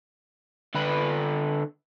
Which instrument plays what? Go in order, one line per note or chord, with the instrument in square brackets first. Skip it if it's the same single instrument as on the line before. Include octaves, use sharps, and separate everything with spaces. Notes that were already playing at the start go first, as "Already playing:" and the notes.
[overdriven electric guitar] D3 B4